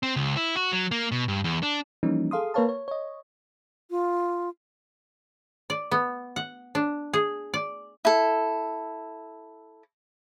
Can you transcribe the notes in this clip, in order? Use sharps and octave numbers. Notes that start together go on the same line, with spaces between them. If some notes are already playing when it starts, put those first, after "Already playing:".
C4
C#2
E4
F#4
F#3
A#3
B2
G2
E2
D4
E3 F3 G3 A#3 C#4 D#4
G#4 A4 F5 C6 D#6
A#3 A#4 B4 C#5 F5 A5
C#5
C#5 D#5
F4
D5
B3
F#5
D4
G#4
D5
E4 A4